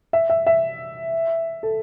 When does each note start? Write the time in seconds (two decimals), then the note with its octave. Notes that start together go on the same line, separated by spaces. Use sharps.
0.13 E5
0.30 E5
0.47 E5
1.63 A4